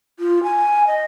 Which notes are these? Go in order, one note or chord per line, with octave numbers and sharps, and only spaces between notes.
F4
G#5
D#5